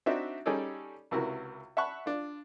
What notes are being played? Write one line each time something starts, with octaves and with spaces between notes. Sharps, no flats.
C4 D4 D#4 F#4 E5
G3 C#4 D#4 G#4 A4 D5
C#2 C3 E4 F#4 A#4
E5 F#5 A5 B5 C#6 F#6
D4 F4